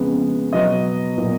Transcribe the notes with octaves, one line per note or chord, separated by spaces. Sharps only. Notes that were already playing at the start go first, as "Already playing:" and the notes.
Already playing: F2 C#3 G#3 B3
B2 F#3 B3 D#5
A#2 F#3 B3